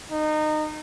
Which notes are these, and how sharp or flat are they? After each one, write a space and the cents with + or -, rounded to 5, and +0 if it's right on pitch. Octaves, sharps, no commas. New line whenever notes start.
D#4 -25